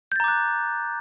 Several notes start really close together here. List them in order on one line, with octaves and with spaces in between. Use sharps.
G6 A6 A#5 D6 F#6